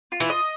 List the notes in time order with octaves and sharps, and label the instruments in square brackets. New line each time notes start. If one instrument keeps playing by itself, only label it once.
[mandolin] F4
[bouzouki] E3 E4
[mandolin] D#5